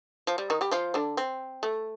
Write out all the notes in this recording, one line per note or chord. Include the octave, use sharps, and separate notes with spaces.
F3
G3
D#3 D#4
G3 G4
F3 F4
D3 D4
C4
A3